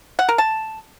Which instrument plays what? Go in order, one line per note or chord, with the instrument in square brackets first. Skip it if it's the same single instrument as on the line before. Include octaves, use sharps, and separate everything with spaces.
[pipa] F#5
A#4
A5